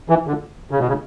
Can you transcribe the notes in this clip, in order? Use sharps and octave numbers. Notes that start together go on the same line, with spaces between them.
E3
D3
C#3
B2
C#3